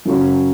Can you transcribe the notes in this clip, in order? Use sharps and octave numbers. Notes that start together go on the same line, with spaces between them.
F#2 C#3 F#3 C#4